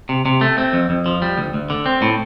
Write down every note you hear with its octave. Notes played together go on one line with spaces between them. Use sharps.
C3
C3
A3
C4
F2
F2
F3
G3
D2
D2
D3
C4
A2